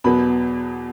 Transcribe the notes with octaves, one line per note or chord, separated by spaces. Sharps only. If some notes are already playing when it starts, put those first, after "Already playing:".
E2 B2 F#3 B3 B5